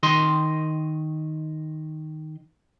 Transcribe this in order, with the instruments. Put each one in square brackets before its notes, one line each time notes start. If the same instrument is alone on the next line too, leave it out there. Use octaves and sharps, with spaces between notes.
[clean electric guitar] D#3 D#5 C6